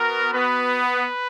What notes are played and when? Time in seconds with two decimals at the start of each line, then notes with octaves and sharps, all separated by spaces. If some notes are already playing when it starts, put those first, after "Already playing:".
Already playing: B3 F#4 A#4
0.34 B3 B4